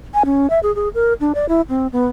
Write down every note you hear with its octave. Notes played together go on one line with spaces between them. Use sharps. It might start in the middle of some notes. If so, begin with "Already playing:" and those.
G#5
C#4
E5
G#4
G#4
A#4
D4
D5
E4
C4
B3